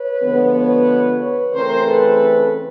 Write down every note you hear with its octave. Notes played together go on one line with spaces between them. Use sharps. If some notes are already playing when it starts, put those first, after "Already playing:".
Already playing: B4 C#5
D3 F3 G#3 B3
B4 C#5
B4 C#5
C#3 E3 A3 C4 A#4 C5
A4 B4